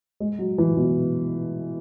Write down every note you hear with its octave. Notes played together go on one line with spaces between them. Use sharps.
G#3
F#3
E3
B2